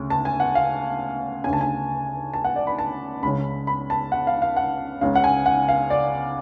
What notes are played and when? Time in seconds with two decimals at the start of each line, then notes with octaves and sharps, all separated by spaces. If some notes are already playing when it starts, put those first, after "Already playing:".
Already playing: D2 C#3
0.10 A5
0.25 G#5
0.40 F#5
0.55 F5
1.44 C#3 G#5
1.48 D2 A5
1.61 G#5
2.34 A5
2.44 F#5
2.56 D5
2.67 B5
2.79 A5
3.23 C#2 C#3 B5
3.67 B5
3.90 A5
4.12 F#5
4.27 F5
4.42 F5
4.57 F#5
5.01 C#2 C#3 F5
5.15 F#5
5.24 G#5
5.46 F#5
5.68 F5
5.90 D5